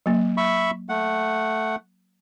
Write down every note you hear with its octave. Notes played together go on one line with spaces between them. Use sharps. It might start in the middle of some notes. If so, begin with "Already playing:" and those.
F#3 A#3
E5 B5 C#6
A3 F#5